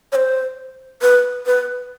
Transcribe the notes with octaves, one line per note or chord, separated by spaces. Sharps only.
C#5
C5
B4
B4